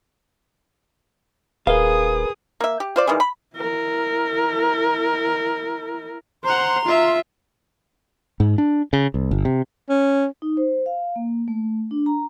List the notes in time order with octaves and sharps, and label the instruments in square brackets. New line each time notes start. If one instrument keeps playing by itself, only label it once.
[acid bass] D#1 [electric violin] G#4 D#6 [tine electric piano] A#4 B4 [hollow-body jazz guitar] F5
[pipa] A#3 E5
G4
F4 C5 D5
D#3 E3 G3 G#3
B5
[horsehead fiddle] E4 A#4
[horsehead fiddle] C5 F#5 [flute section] A#5 C6
[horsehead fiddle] F4 E5
[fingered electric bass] G#2
D4
C#3
C2
G1
C3
[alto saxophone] C#4
[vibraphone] D#4
C5
F5
A#3
A3
D4
A#5